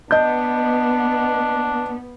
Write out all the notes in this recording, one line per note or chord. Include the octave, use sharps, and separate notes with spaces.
B3 D4 D#5 G6